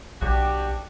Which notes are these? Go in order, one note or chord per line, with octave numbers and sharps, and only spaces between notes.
B1 D4 F#4 G4